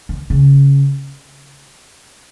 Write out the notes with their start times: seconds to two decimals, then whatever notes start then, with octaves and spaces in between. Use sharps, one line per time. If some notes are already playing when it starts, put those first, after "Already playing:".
0.09 D#3
0.30 C#3